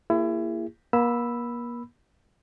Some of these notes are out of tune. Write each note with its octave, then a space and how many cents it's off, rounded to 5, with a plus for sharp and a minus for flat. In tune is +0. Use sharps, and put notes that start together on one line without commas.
A#3 -15 E4 +30 G#4 -30
A#3 +40 B5 +0 E6 +0